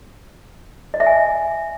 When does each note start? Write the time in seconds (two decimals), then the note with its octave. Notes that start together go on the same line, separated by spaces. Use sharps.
0.94 D#5
1.00 E5
1.06 G#5